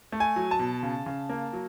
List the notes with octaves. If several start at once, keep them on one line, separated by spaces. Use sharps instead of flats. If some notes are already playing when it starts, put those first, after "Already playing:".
A3
G#5
F#3
A5
B2
C#3
C#3
A#3
F#3